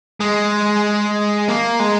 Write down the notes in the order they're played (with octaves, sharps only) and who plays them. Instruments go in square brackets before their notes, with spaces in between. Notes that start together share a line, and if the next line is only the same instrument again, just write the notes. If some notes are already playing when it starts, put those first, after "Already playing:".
[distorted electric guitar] G#3
A#3
G#3